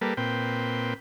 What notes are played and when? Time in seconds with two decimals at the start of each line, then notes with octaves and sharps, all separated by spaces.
0.01 G3 A#3 A4 B4
0.17 A#2 C4 B4 G5